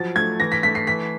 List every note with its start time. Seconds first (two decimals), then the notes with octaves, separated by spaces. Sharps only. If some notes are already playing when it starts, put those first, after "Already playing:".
Already playing: F3 F#3 A6
0.15 A3 G#6
0.39 E3 A#6
0.52 B6
0.63 A3 B6
0.75 C7
0.87 E3 B6